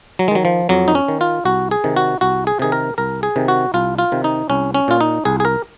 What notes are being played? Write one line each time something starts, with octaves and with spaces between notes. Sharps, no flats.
F#3
G#3
D#3 F#3
F3
F2 F#3
D#4
C#4
D#3
F4
C2 F#4
G#4
C3 D#3
F#4
C2 F#4
G#4
C3 D#3 G#4
A#4
C2 A#4
G#4
C3 D#3
F#4
C2 F4
F4
C3 D#3
D#4
C2 C#4
C#4
A#2 F4
D#4
C2 G#4
G#4
A#4